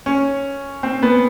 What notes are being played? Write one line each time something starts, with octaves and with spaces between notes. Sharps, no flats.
C#4
C4
B3